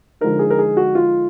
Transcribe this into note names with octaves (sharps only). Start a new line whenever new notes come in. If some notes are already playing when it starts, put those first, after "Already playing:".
D3 F3 G#3 D#4 A#4
G#4
A#4
G#4
F#4
F4